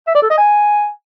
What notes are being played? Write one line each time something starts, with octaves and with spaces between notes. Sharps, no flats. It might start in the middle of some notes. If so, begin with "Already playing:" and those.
E5
D5
A4
D#5
G#5